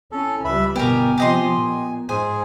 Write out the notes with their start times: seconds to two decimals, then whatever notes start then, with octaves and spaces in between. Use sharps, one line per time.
0.12 C#4 E4 A4
0.45 C#2 G3 B4 E5 B5
0.76 G1 B2 B3 G4 A#4 G#5
1.18 C3 F3 G4 D#5 C6
1.52 A#2
2.09 G#2 G#4 C5 G#5